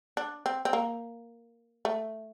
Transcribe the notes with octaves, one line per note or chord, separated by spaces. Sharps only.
D4
C4
C4
A#3
A3